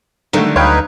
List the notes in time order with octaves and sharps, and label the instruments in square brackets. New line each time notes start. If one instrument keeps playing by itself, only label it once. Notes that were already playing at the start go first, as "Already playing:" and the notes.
[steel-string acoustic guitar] D3 F#3 G3 [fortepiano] D#3 A3
[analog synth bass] D2 [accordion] D#4 B4 [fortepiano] C#5 F5 G5